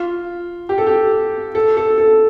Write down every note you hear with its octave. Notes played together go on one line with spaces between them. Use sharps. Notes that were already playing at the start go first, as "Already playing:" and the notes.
Already playing: F4
G4
A4
G4
A4
A4
A4